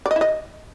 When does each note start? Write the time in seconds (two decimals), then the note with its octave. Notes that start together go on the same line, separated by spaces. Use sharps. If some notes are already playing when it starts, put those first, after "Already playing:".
0.06 D5
0.11 D#5
0.16 E4
0.21 D#5